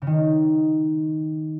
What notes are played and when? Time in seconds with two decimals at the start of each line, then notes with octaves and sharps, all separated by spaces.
0.02 C#3
0.07 D#3